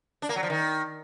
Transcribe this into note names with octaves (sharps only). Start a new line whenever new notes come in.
D4
A#3
F#3
F3
D#3